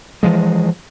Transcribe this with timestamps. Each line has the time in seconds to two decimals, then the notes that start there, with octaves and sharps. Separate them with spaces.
0.23 E3 F3 G#3